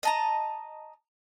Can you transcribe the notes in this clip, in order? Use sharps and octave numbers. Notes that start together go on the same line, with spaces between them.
D#5 A5 A#5